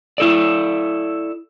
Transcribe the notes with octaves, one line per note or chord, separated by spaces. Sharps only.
E4 A4 D5